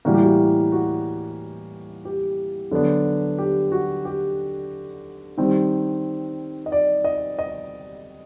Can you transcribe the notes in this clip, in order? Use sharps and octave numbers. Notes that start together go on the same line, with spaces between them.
A2 E3 G3 A#3 F#4
G4
F#4
F#4
G4
D3 F#3 B3 D4
G4
F#4
G4
D#3 G3 C4
D#5
D5
D#5
D#5